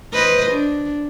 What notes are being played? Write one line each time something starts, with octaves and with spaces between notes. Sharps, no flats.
B4 C5 D#5
D4